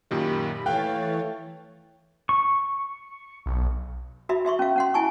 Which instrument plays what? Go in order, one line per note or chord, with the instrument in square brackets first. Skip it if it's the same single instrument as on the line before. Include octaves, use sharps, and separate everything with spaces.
[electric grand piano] F#2 A#2 D#3 [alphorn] G4 [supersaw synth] B5
[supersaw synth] E3 C#5 A6 [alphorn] A3 [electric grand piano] F5 F#6 [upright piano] G5
[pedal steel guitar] C#6
[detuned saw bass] B1
[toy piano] F#4 E5 B5
F#4 E5 C6 C#6
C#4 F5
C#4 F#5 C6
E4 G#5 A5 C#6